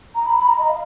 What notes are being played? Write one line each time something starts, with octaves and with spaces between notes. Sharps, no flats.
A#5
B5
B5
A#5
D#5
F5